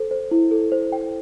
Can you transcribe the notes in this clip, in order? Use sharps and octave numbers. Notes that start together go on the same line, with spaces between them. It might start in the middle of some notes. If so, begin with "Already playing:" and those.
Already playing: A4 C5
C5
E4
A4
C5
G5